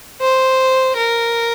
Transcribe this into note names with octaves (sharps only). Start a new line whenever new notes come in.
C5
A#4